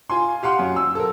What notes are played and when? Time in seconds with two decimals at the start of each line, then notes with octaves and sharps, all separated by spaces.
0.10 F4 G#5 C6
0.43 G4 F5 F#5 C6
0.59 F#2
0.76 E6
0.95 A4 A#4